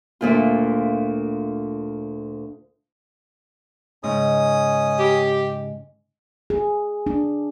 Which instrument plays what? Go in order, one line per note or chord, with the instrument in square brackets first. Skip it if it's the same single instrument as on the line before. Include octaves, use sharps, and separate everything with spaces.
[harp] D2 A#2 F4
[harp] G#2 C#3 [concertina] C#4 D#6
[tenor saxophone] G4
[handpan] G#4
D4